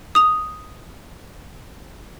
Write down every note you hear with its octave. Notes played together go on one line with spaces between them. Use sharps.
D#6 F7